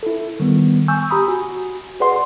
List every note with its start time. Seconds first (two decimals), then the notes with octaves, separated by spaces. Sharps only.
0.03 E4 A4
0.40 D#3 G3 B3
0.88 G#5 C#6 E6 G6
1.10 G4 A#5 B5 D#6
1.28 F#4 G#5
2.00 G#4 B4 D5 F#5 C6